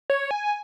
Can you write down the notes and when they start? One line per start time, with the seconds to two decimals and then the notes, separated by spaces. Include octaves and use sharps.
0.10 C#5
0.31 G#5